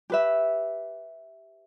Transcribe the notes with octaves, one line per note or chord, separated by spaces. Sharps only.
G4 B4 E5